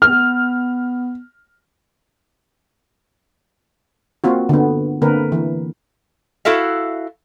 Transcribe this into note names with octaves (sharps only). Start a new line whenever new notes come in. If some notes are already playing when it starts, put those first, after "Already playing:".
B3 F6
A#3 C4 F4 F#4
D3 B3
D3 A#3 C4 A#4 B4
E3
E4 F#4 A4 E5 F5